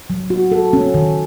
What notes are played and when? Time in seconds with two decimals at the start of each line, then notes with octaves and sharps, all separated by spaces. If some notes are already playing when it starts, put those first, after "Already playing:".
0.10 F#3
0.30 F#4
0.52 A4
0.73 C#4
0.94 D#3